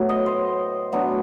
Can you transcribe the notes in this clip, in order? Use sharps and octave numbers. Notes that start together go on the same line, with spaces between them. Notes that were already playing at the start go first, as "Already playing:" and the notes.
Already playing: A2 F#3 B3
D#5
C5
A2 F#3 B3 D4